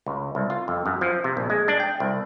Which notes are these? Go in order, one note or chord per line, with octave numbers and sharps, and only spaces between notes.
C#2
C2
F4
F2
F#2
F3
C3
A#1
G#3
D4
G5
C2